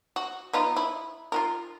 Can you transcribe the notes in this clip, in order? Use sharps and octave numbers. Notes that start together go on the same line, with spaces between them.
F#4
B3 D#4 F4
E4
F4 F#4 A#4